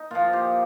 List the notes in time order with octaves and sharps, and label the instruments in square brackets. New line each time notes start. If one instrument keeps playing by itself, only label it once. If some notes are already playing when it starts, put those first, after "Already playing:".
Already playing: [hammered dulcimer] D#4
A#2 F3 F4
G4